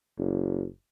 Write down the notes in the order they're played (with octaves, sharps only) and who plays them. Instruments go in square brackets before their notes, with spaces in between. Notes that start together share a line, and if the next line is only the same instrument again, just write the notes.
[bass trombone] F#1